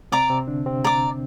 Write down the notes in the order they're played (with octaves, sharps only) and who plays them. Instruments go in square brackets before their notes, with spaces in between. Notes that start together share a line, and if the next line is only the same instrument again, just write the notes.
[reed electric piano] C3 C4 [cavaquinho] D5 A#5 D6
[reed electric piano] C3 C4
D3 D4
C3 C4
[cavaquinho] D5 A#5 D6